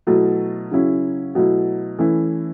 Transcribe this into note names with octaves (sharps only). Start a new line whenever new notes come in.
B2 F#3 A3 E4
C#3 F#3 C#4 E4
B2 F#3 A3 E4
E3 A3 C#4 E4